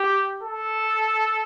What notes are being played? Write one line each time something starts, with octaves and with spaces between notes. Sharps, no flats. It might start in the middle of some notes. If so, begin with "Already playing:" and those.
Already playing: G4
A4